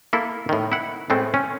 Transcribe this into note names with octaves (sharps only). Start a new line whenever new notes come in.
A#3 E4 A4
A2 D#3
E4 F#5
A2 G#3 A3 C4
C#4